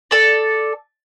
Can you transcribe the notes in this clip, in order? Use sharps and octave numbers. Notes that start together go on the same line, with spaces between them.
A4 D5